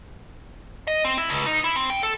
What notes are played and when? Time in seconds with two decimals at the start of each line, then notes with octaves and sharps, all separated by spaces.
0.87 D#5
1.05 C4
1.18 E4
1.29 C#2
1.46 D#4
1.64 E4
1.76 C4
1.90 G5
2.03 A4